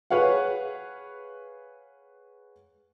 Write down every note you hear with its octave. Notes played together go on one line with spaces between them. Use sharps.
G#4 B4 C#5 F5 F#5